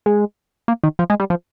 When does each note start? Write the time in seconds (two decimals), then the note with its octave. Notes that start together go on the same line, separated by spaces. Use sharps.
0.06 G#3
0.68 A#3
0.84 D#3
0.99 F3
1.10 G#3
1.20 G3
1.30 F3